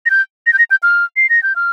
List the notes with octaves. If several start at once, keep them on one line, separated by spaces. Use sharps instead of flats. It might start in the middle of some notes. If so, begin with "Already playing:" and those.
A#6
G6
A#6
G6
A#6
G6
F6
C7
A#6
G6
F6